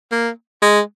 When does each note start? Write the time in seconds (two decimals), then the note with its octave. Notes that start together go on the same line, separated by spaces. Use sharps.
0.12 A#3
0.62 G#3